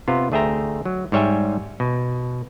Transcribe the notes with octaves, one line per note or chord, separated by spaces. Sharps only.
C3 B3 F4
D2 A3 G#4 E5 G5 A#5
F#3
G#2 G3 C#5 E5 G5 G#5
B2